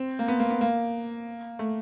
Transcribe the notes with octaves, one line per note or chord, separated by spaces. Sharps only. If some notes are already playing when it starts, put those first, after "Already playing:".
Already playing: C4
A#3
B3
A#3
B3
A#3
A3